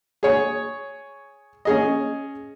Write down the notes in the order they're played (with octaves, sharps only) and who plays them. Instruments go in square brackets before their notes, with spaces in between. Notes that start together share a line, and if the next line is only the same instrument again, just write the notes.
[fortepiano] G#4 C#5
C#4 G#4 D#5